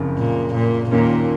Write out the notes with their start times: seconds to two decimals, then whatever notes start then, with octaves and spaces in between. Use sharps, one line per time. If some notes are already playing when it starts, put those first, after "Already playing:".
Already playing: F#1 F2 C#3
0.18 A#2
0.54 A#2
0.90 D#2 A#2 D#3 A#3 C#4